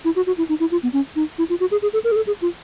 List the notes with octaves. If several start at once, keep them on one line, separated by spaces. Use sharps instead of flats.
E4
F#4
F#4
E4
D#4
E4
F4
B3
C#4
D#4
E4
F4
F#4
G#4
G#4
A4
A#4
G#4
A4
G#4
F4